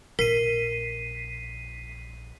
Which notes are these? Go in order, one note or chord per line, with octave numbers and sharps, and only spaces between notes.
A#1 A#4 B6 C7 D#7